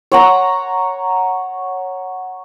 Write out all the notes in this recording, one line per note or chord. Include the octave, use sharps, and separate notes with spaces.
C#5 F#5 A#5